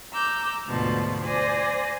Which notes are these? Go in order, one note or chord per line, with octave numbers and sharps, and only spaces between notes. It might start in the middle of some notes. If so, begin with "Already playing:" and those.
A#5 D6 E6 G6
D2 G#2 B2 F3 A5
C5 D5 G#5 A#6